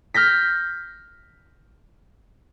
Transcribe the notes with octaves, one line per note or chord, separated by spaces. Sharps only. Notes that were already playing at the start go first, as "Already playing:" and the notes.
F6 G6 A#6 B6